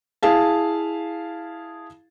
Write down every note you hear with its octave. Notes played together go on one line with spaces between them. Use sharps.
E4 G#4 F5 A5